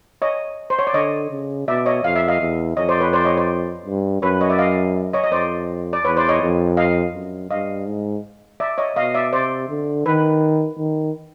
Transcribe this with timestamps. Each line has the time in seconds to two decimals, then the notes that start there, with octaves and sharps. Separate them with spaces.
0.22 C#5 D#5
0.70 C5
0.79 C#5
0.87 D5
0.94 D3 C#5 D#5
1.31 C#3
1.67 B2 D5 E5
1.86 C#5 D#5
2.04 F2 F5
2.16 E5
2.28 D#5 F5
2.40 E2
2.77 F2 C#5 D#5
2.89 C5 D5
3.01 B4 C#5
3.13 C5 D5
3.25 C#5 D#5
3.37 C5 D5
3.86 G2
4.22 F#2 B4 C#5
4.41 C#5 D#5
4.50 D5 E5
4.59 D#5 F5
5.13 C#5 D#5
5.24 D#5
5.32 F2 C5 D5
5.93 D5
6.04 E2 B4 C#5
6.17 C5 D5
6.29 C#5 D#5
6.42 F2
6.77 D#5 F5
7.14 F#2
7.51 G2 D#5 F5
7.86 G#2
8.60 D5 E5
8.78 C#5 D#5
8.96 B2 D#5 F5
9.14 D5 E5
9.32 C3 C5 D5
9.69 D3
10.06 D#3 B4
10.79 D#3